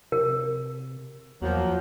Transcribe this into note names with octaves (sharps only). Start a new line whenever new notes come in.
C3 A#4
E2 F3 F#3 A#3